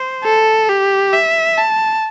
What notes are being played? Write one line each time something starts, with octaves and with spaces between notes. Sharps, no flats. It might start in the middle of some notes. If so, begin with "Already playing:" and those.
Already playing: C5
A4
G4
E5
A5